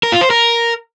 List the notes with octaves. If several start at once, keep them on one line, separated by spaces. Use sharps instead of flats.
A#4
F4
C5
A#4